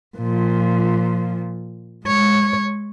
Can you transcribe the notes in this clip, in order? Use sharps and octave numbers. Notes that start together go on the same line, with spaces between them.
A#2 F3
G#3 C#5